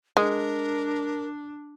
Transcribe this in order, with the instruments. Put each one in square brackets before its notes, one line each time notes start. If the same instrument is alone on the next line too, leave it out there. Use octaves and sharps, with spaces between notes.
[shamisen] G#3 [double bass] D4 [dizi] A#4